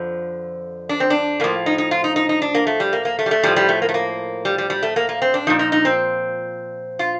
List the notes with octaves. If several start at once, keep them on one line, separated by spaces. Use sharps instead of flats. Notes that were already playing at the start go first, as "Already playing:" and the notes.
Already playing: F2 D3 F3
D4
C4
D4
A2 F3 A#3
D#4
D#4
F4
D#4
D#4
D#4
D4
A#3
A3
G3
A#3
A#3
A3
G3
A3
A2 F3 G3
G3
A3
A#3
A3
A#3
G3
G3
G3
A3
A#3
A#3
C4
D4
A#2 F3 D#4
D#4
D#4
C4
F4